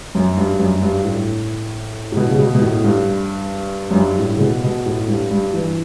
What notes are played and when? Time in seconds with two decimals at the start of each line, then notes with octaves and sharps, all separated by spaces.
0.15 F#2
0.37 G2
0.59 F#2
0.82 G2
1.05 A2
2.12 A2
2.17 B2
2.31 C#3
2.39 B2
2.55 B2
2.61 A2
2.84 G2
3.91 F#2
3.96 G2
4.19 A2
4.36 C#3
4.41 B2
4.64 B2
4.86 A2
5.08 G2
5.31 G2
5.53 E3